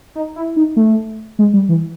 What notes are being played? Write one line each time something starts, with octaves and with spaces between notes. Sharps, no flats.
D#4
E4
D#4
A3
G#3
G3
E3